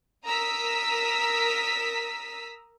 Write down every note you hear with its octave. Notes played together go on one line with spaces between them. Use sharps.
A#4 A#5 D#6 E6 B6